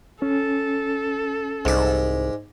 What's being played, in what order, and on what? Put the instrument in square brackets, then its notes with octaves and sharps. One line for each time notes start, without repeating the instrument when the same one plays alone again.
[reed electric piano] C#4 [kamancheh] A4
[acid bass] C2 [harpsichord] G#2 D5